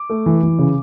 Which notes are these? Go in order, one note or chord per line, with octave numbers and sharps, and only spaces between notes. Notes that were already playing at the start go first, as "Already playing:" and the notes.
Already playing: D6
A3
E3
E3
C#3